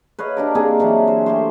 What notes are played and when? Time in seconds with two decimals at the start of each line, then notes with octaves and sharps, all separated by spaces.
0.19 B4 C#5 D#5 F5
0.37 D4 G4 A#4
0.55 A#3 C4 D#4 G#4
0.80 E3 F#3 D4
1.07 C5
1.26 A3 G4 C5